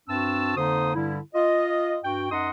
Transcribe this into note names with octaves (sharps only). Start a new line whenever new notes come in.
G2 C4 D4 F#4 A5 E6
F2 D3 A#3 D#4 C5 D#6
G2 D3 G3 E4
F4 D#5
G2 F#4 G5
F#2 D#4 D#5 F#5 C6 D#6